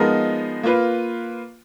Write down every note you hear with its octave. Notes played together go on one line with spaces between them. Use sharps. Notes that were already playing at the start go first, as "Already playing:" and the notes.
Already playing: F3 G#3 B3 D#4 A#4
A#3 F4 B4